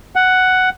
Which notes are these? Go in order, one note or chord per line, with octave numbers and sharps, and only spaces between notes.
F#5